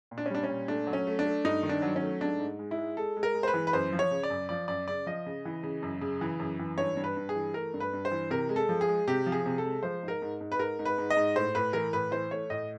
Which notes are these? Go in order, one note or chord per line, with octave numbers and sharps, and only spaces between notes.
A#2
D4
C#4
G3 D4
C#4
A#2
A3 D4
F#3
C#4
A3
D4
A3
G2 D#4
D#3
D4
F#3
C#4
A3
G#2 D4
G#2
G#3
E4
G#3
G#3 A4
G#3
A#4
G#3
C5
B4
E3
B4
F#2 C5
F3
C#5
C#3
D5
F#2
F3 D5
F#2 D5
C#3 D5
F3 D#5
C#3
E3
C#3
F#2
C#3
E3
F#2
E3
G2 C#5
G2
B4
G2
G#4
E3
A3 A#4
G2
B4
G2
C5
E3
C3 A#4
G#3
A4
F3
G#4
G#3
C3 G4
F3
G#4
C3
A4
G#3
F3 C5
G#2
A#4
G#2
G#2
B4
G#2 A#4
G#2
B4
G#2
D#5
G#2
A2 C5
A2 B4
E3 A#4
A2 B4
E3 C5
A3 C#5
A2 D#5